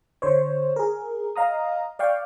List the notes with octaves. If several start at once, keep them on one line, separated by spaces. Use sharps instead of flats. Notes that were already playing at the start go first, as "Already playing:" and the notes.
D3 C5 C#5
G#4 A#4
D#5 F5 A#5 D#6
D5 F5 G5 C#6